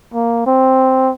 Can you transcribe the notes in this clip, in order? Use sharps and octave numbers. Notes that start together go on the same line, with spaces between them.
A#3
C4